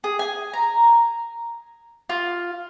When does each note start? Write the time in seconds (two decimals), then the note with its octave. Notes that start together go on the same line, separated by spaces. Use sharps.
0.04 G#4
0.19 G#5
0.54 A#5
2.09 F4